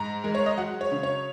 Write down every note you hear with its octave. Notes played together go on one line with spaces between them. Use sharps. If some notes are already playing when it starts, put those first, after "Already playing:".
Already playing: G#2 A#5
G#3 A#4
C#5
D#5
F#3 F#5
C#5
C#3
C#5